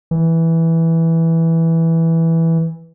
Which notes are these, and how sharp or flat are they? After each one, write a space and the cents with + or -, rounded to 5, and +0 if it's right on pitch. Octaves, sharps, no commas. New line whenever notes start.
E3 -5